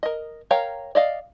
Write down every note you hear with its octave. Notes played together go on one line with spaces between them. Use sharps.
A#4 D#5
A#4 C#5 F5 G5 A#5
D5 D#5 F5